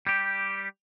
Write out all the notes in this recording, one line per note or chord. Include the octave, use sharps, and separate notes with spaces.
G3 G4